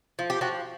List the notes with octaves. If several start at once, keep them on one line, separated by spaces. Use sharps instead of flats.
F3
G4
F3 F#4